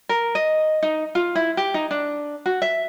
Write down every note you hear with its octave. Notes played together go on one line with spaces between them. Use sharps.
A#4
D#5
D#4
F4
E4
G4
D#4
D4
F#4
E5